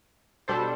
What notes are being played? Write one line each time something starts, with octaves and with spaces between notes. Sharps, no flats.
B2 G3 D4 A4 C5